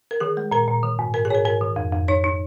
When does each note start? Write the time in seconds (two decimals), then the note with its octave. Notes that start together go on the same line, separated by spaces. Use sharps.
0.11 A#4
0.20 D#3 G#4
0.37 G#3
0.52 A#2 A#4
0.68 A#2
0.83 D#3
0.99 G#2
1.14 G#2 A#4
1.25 G#4
1.30 G#2 A#4 C#5
1.45 G#2 A#4
1.61 D#3
1.76 F2
1.93 F2
2.08 D#4 C#5
2.24 D#4